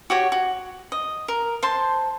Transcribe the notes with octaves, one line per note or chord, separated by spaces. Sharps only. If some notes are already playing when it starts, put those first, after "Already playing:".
F#4 G4 C#5
F#4
D#5
A#4
C5 A5 C6